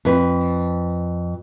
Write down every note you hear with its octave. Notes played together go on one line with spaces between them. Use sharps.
F2 B4